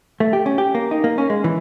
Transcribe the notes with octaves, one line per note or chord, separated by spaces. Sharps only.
A3
G4
C#4
G4
A#3
D#4
A#3
C#4
G#3
E3